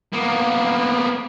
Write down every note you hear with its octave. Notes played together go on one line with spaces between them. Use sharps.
A#3 B3